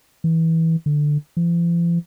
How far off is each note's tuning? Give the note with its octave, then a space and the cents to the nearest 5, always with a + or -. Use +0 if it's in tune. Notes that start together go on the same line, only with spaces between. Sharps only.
E3 -20
D3 +10
F3 -45